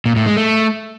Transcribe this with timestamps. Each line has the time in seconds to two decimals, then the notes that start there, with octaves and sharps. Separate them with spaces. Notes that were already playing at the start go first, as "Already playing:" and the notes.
0.06 A#2
0.16 A2
0.26 G#3
0.37 A3